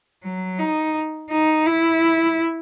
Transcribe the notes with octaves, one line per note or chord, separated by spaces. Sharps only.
F#3
D#4
D#4
E4